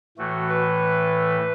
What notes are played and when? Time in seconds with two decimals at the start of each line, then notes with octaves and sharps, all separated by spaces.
0.18 A2 E3 A3 F#4
0.49 B4